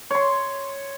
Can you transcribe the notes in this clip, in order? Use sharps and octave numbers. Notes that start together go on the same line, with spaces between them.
C#5 C6